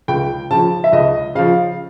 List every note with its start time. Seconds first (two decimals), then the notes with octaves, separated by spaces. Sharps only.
0.08 C#2 G5
0.51 C#3 F3 A5
0.84 E5
0.92 C#2 D#5
1.35 C#3 F3 F5